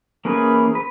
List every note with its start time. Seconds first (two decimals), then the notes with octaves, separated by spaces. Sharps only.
0.25 E3 A#3 C#4 G#4 B4
0.75 B4